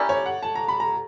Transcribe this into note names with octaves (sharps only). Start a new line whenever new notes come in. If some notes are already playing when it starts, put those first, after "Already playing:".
Already playing: A#3 C#4 E4 G4 D5
C#5
F#5
A5
A#5
B5
A#5